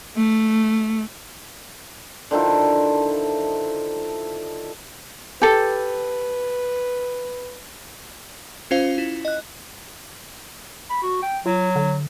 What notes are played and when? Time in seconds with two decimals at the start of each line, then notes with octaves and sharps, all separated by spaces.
0.16 A3
2.31 D3 D#3 F3 E4
5.42 G4 A4 B4
8.71 C#4 F4 C5 F5
8.98 E4
9.25 D#5 F#6
10.90 B5
11.03 F#4
11.23 G5
11.46 F#3 F4
11.76 D3